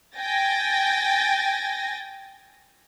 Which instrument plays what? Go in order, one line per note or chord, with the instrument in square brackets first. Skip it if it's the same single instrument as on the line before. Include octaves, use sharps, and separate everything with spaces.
[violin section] G5 G#5 A6 A#6